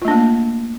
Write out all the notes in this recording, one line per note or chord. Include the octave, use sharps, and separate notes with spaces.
A3 A#3 D4 F4